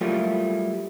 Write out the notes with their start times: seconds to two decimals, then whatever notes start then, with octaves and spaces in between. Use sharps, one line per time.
0.01 F#3 G3 A3 A#3 E4 F4